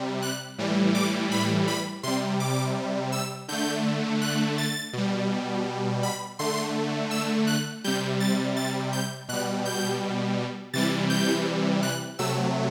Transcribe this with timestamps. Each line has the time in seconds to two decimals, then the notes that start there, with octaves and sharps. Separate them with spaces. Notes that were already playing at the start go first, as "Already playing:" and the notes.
Already playing: C3 G3
0.22 F#6
0.58 A2 E3 G3
0.95 D6
1.31 B5
1.68 B5
2.03 C3 G3 C6
2.40 D6
3.12 E6
3.48 D3 A3 G6
4.22 F#6
4.58 A6
4.93 B2 G3
6.03 B5
6.39 D3 A3 C6
7.11 E6
7.47 F#6
7.84 C3 G3 G6
8.20 A6
8.57 A6
8.93 G6
9.29 B2 G3 F#6
9.65 G6
10.74 C3 E3 G3 A6
11.10 G6
11.83 F#6
12.19 C3 F#3 A3 E6